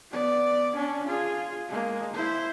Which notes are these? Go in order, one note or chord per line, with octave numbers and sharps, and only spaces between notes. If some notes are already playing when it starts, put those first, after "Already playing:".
B3 D5
C#4 D4
F4 G#4
G#3 A#3
E4 C5